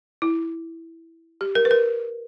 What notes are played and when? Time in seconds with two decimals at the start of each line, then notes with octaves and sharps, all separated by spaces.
0.22 E4
1.41 G4
1.55 A#4
1.65 B4
1.71 A#4